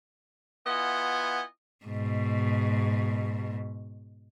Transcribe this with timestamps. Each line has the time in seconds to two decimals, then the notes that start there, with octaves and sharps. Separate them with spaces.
0.67 B3 E4 F4 D#5 F#5 G#5
1.86 G#2 B2